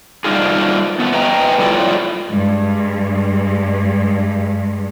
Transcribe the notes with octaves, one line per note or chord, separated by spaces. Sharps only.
G3 D4 D#4 F4 G#4
A3 B3
B4 D#5 G5 G#5 A#5
G3 E4 F4 A4 C#5 D5
G2 G#3